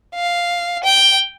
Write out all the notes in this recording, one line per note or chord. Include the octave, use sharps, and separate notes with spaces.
F5
G5